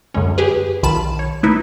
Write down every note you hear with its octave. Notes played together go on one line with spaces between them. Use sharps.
F#2 D3 G#3 C#4
G4 G#4 B4
B1 D#3 F4 A5 B5 E7
C#5
A3 D#4 E4 B4